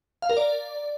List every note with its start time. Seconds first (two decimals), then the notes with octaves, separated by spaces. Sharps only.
0.22 F5
0.30 A#4
0.37 D5